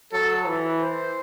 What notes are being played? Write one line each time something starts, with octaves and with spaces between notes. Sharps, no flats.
F#3 A4
E3
C5